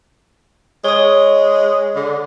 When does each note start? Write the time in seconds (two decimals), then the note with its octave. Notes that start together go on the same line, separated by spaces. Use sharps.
0.84 G#3 C#5 D#6
1.96 D3